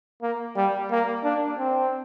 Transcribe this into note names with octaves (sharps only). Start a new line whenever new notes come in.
A#3
G3
A#3
D4
C4